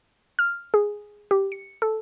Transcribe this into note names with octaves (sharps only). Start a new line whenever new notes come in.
F6
G#4
G4
C#7
A4